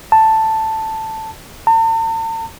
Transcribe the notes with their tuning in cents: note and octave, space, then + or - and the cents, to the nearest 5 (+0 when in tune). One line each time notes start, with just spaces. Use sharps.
A5 +5
A5 +45